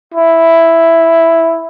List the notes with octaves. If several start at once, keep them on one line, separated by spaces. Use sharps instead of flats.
E4